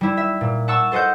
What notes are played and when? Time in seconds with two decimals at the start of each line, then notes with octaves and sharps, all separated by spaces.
0.01 G3 E4
0.17 E5
0.41 A#2
0.68 F#5 A5 C#6 E6
0.92 A4 C5 D#5 F#5 G6